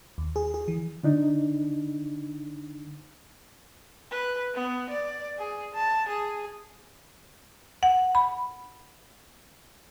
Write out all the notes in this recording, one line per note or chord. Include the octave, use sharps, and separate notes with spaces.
D#2
G#4
G#4
E3
D3 D4 D#4
B4
B3
D5
G#4
A5
G#4
F#5
B5